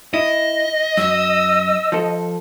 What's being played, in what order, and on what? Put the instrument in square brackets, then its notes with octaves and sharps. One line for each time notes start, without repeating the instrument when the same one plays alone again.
[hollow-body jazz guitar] E4 [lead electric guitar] D#5
[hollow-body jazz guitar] F#2 [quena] E6
[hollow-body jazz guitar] F3 A4